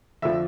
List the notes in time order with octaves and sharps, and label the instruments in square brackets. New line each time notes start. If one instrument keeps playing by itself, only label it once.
[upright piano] F2 D3 F3 E5